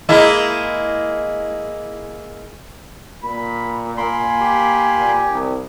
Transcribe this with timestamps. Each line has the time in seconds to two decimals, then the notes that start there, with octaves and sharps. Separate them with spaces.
0.09 G#3 A#3 E4
3.24 A#2 B5
3.97 A#3 G#5 B5 C6
4.40 G4
4.98 A#2
5.31 C2